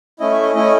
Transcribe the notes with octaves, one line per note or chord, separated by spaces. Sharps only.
A3 C#4 E4 D#5
E5
D#5
A3 C#4 E4 D#5